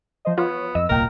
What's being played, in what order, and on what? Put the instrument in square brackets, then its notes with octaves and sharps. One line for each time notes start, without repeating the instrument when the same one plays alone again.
[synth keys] F3 C5 D#5
[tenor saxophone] B3 [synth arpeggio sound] F4 [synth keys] C#5
[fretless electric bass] F2 [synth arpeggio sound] D#5 [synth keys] E6
[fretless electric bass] D#1 C2 A#2 [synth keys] A#3 G5 A#5 [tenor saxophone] A#4